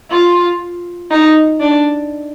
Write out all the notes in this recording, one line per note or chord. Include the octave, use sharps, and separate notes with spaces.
F4
D#4
D4